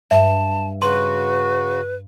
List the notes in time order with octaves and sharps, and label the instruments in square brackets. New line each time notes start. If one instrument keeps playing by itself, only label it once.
[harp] G2 [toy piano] E5 [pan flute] A5
[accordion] C#3 F#4 [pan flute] B4 [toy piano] C6